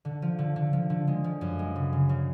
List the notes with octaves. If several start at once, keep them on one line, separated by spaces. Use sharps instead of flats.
D3
F3
D3
D3
F3
D3
G#3
F3
F#2
G#3
C#3
C#3
C#3